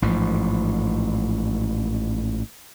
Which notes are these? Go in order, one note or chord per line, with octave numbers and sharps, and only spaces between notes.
A1 G#2 F3